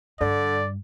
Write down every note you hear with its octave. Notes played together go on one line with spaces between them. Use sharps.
G2 D3 D5